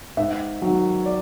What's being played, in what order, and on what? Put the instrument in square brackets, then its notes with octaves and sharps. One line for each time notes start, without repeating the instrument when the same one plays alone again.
[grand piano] G#2 E5
D#3 F#3
D5